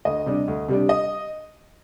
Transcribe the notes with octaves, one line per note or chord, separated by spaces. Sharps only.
D2 D#5
C3 G3 D4
D2
C3 G3 D4
D#5